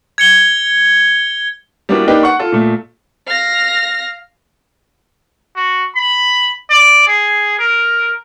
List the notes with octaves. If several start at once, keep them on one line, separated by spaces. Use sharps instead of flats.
G#6 C#7 G7
G3 A#3 B3 D4 E4 F#4
A#3 D4 D#4 G4 B4
F#5 C#6
F4 A4
A#2 A3
F5 A#6
F#4
B5
D5
G#4
A#4